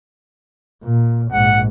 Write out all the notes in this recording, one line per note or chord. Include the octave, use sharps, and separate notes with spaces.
A#2
A#1 G#2 F#5